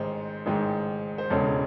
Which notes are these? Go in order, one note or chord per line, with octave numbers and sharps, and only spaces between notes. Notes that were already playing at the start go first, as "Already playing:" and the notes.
Already playing: A1 G#2 D#3 C5
A1 G#2 D#3
C5
E1 E2 C#3 G#3 C#4 A4